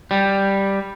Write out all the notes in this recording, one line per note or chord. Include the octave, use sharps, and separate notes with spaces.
G3